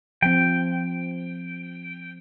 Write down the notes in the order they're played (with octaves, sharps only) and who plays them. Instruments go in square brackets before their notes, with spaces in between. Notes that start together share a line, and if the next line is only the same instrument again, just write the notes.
[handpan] F3 C4 [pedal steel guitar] G5